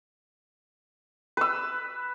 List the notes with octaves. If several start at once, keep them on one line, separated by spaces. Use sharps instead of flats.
B4 E6